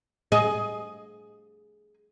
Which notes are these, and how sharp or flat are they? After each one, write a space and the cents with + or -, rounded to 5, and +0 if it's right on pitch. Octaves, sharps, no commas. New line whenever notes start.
G#4 +15 D#5 +0